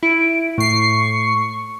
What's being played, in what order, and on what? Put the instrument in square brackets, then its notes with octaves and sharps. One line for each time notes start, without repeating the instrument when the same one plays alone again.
[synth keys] E4 [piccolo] D7
[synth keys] A2 C7 [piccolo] C#6